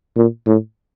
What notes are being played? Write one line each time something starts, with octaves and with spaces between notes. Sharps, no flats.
A#2
A2